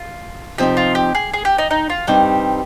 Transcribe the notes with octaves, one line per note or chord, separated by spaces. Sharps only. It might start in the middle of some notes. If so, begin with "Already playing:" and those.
Already playing: F4
C3 F3 C4 D#4 G4
F4
G4
G#4
G#4
G4
D#4
D#4
F4
G2 G3 C4 D#4 G4